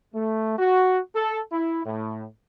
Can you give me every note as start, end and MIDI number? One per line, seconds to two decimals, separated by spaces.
0.13 0.56 57
0.58 0.99 66
1.14 1.40 69
1.51 1.80 64
1.84 2.24 45